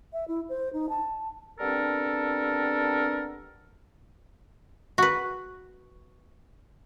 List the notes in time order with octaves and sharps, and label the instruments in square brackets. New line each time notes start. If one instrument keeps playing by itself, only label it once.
[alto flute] E5
E4
C5
D#4
A5
[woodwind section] G3 B3 C4 D4 A4 A#4
[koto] F#4 B4